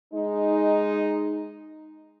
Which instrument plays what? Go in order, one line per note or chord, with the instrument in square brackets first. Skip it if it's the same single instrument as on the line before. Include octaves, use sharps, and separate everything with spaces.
[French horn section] G#3 D#4